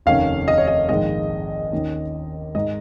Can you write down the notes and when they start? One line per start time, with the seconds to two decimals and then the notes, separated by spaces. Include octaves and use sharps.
0.06 F1 D#2 D#3 C#4 F5
0.48 D#5
0.58 C#5
0.67 D#5
0.89 A#1 G#2 D#3 G#3 D#5
1.72 D#2 D#3 C#4
2.55 G#2 G#3 D#4 D#5